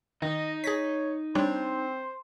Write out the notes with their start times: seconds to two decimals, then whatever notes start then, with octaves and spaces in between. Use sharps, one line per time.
0.22 D#3 D#4 D#5
0.64 G#4 C#5 A#6 B6
1.35 G3 C4 D4 C5 C#5